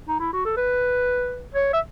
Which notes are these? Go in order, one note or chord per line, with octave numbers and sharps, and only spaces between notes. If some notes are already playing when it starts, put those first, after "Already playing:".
D#4
E4
F#4
A4
B4
C#5
E5